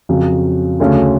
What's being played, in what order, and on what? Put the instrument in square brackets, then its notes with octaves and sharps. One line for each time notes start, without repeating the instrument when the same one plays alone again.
[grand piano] F2 C#3 F#3
D2 C#3 F#3 A3 C#4